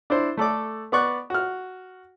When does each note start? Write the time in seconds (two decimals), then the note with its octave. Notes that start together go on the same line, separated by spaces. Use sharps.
0.10 D4 E4 C5
0.37 A3 A4 D5 D6
0.92 B3 D5 C#6 F#6
1.30 F#4 F6